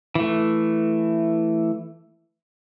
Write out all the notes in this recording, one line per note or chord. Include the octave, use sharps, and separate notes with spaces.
E3 A3